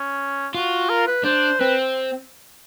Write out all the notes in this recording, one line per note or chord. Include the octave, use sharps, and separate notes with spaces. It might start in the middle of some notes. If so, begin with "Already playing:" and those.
Already playing: C#4
F4 F#4
A#4
B4
D4 C5
C4 B4